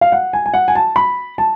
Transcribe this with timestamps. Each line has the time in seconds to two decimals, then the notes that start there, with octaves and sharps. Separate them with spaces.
0.01 F5
0.12 F#5
0.33 G#5
0.46 G#5
0.54 F#5
0.68 G#5
0.75 A5
0.96 B5
1.38 A5